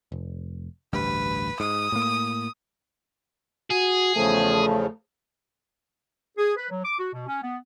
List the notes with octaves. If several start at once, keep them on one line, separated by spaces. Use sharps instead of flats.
F1
A1 D2 G2 B4
G#2 D#6
A2 A#3
F#4 G#4
E2 C#3 F3 A3
G#4
B4
F#3
D6
F#4
B2
C#4
B3